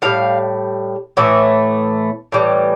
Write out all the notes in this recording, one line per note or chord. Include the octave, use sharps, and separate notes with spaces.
A2 G3 F5
A2 E3 A3 E5
A2 E3 G3